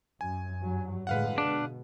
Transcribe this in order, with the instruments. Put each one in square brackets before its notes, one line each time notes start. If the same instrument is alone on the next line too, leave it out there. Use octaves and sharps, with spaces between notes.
[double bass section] F#2 [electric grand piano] G#5
[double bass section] G2 F#3
[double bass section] A2 D3 G#3 [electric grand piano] B4 F5 F#5
[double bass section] B2 [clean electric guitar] D4